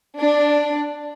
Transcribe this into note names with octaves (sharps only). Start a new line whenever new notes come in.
D4